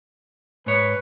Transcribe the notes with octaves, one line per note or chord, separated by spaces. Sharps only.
G#2 B4 C#5